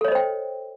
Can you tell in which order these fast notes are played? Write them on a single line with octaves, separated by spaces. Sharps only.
A4 C#5 D#5 C5 G5